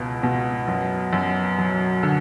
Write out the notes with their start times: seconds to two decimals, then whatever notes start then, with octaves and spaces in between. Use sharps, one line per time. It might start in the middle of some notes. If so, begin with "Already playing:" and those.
Already playing: C#2 B2
0.23 B2
0.68 F#2
1.13 F#2
1.58 F#3
2.03 D3